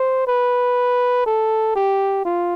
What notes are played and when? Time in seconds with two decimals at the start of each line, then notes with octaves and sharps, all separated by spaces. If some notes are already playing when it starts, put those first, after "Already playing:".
Already playing: C5
0.27 B4
1.26 A4
1.76 G4
2.25 F4